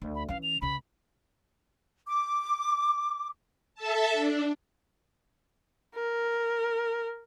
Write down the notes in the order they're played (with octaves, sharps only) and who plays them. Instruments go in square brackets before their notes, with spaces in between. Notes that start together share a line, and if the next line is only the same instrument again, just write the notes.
[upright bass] D2
[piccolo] B5
[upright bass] E3 C#4 [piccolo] F5
[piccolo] F7
[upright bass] C#2 C#3 [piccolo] B5
[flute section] D6
[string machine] A4 E5 A5
D4
[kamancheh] A#4